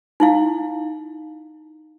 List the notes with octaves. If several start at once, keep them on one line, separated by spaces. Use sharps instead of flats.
D#4 E4 F5